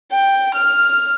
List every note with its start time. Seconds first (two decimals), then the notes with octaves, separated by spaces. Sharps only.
0.12 G5
0.55 F6